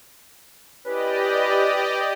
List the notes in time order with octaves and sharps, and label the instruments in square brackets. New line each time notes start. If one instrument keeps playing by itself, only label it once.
[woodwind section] C#4 E4 B4 [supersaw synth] G4 D5 D#5